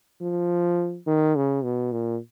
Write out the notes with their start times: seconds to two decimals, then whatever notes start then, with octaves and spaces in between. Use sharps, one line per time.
0.21 F3
1.07 D#3
1.36 C#3
1.63 B2
1.92 A#2